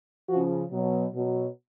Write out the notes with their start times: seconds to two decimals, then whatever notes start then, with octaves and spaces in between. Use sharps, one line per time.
0.29 C#3 F3 F#4
0.71 B2 F#3
1.12 B2 F#3